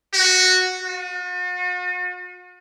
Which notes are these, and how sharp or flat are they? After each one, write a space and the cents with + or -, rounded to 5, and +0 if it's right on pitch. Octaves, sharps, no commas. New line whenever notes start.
F#4 -5
F#4 -45